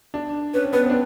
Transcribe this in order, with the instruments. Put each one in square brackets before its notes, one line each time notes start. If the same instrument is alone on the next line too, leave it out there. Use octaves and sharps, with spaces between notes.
[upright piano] D4
[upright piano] C#4 [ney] B4
[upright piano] C4
[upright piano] B3 [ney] B4
[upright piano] C4
D4